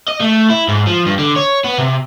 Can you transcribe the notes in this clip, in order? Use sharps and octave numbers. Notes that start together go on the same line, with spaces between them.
D#5
A3
E4
G#2
F3
G2
D3
C#5
B3
C3